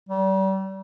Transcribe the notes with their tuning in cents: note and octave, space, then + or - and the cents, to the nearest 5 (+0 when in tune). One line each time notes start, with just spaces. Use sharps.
G3 -35